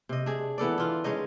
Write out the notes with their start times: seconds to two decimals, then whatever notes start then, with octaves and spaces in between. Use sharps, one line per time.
0.09 C3 D#5
0.26 D4 G#4
0.58 E3 B3 A4 D5
0.78 E3 F4
1.04 G#3 C#4 D#4 D#5